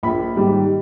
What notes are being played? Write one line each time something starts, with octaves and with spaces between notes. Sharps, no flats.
A#1 B5
G#2 D#3 G3